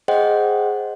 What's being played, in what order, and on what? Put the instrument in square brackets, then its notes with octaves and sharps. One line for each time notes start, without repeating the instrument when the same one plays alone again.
[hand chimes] G#4 C5 D#5 F#5 G5